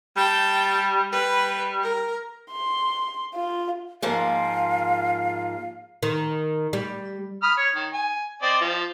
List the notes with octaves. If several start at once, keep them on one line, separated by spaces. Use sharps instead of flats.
G3 G5 A5
G3 B4
A#4
C6
F4
G#2 F3 A#3 F5
D#3
G3
B5 D#6 F6
C#5
D#3
G#5
C4 D5 D#5
F3